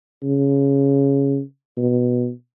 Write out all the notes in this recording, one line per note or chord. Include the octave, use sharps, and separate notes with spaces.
C#3
B2